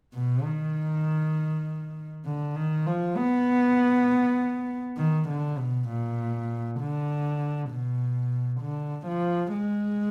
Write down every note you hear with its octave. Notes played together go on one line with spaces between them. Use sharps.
B2
D#3
D3
D#3
F3
B3
D#3
D3
B2
A#2
D3
B2
D3
F3
G#3